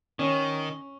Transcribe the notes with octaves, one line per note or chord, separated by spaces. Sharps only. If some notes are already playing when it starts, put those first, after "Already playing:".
D#3 C#4